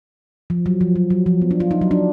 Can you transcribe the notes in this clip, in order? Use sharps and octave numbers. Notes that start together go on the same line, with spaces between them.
F3
F#3
F3
F#3
F#3
F3
B3
D4
F4
D#4
F#3
D4